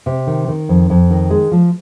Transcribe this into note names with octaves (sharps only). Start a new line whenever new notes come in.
C3
D#3
D#3
F2
F2
D#3
G#3
F3